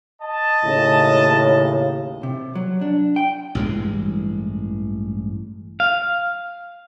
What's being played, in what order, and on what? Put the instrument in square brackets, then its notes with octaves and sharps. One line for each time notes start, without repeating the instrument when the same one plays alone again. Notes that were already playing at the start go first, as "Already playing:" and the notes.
[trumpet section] D#5 A5
[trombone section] D#2 A2 C#3
[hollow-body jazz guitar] C3
F#3
D4
G5
[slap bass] A1 G2 E3 G#3
[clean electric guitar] F5